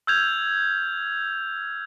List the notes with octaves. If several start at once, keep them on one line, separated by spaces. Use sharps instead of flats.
E6 F6 G6 G#6 F7